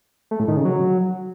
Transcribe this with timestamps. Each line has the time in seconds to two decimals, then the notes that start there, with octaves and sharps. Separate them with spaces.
0.31 A3
0.40 A2
0.48 D#3
0.57 C#3
0.65 F#3